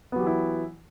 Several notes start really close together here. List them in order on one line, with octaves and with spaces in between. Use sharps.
B3 F#3 G4 E3 E4